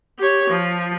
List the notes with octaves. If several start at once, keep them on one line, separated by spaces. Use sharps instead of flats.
G4 C#5
F3